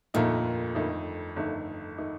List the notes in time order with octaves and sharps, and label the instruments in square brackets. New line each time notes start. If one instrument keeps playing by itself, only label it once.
[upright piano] G1 F2 D#3 A3 D#4 [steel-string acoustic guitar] A#2
[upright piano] G1 F2 D#3 A3 D#4
G1 F2 D#3 A3 D#4
D#3 A3 D#4